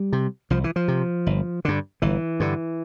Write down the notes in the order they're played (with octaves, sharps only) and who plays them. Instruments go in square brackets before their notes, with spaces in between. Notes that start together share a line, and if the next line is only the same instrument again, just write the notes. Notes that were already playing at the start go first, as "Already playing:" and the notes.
Already playing: [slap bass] G3
C3
C2 F3
E3
F3
C3
G1
G2 D3
G1 E3
G2 D3